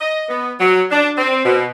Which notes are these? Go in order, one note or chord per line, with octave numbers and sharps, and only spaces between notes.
D#5
B3
F#3
D4
C4
B2